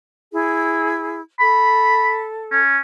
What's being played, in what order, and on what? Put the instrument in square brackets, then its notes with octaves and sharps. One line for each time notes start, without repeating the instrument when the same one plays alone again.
[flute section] E4 G#4
[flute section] A4 [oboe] B5
[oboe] C#4